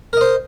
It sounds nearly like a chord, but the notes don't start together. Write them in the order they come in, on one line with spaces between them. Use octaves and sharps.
A#4 D#5 C5